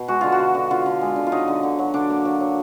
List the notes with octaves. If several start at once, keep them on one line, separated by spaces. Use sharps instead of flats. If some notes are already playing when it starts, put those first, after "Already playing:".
Already playing: B2
G#3 F#4
D3 F4
F#4
D3
D3
D3 F4
D3
G#3
D3
F4
F#3 D#4
D3
D3
F#3
D3 D4
A#3
F#3
F#3